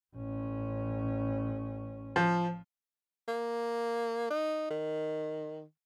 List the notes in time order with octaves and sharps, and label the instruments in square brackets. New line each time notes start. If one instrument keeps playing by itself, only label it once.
[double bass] A1 C#4
[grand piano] F3
[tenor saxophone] A#3
D#4
D#3